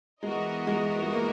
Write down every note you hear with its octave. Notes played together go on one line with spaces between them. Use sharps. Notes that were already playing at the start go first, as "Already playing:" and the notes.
E3 G#3 B3 F#4 A#4 D#5
G#3
G#3
A#3